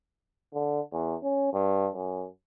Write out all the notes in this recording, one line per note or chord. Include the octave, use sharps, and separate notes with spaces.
D3
E2
C#4
G2
F#2